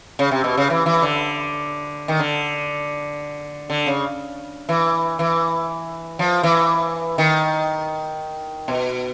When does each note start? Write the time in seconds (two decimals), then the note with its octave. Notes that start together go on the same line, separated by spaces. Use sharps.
0.19 C#3
0.31 C3
0.44 B2
0.57 C#3
0.70 E3
0.86 E3
1.02 D3
2.08 D#3
2.19 D3
3.70 D3
3.86 C#3
4.69 E3
5.19 E3
6.19 F3
6.43 E3
7.18 D#3
8.68 B2